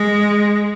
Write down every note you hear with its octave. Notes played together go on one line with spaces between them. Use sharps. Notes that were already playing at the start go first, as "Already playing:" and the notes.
Already playing: G#3